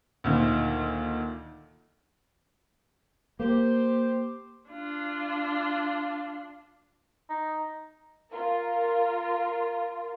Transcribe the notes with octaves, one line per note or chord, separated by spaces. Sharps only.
D2 A#2 D#3
A#3 G4 C5
D4 F4
D#4
F4 A#4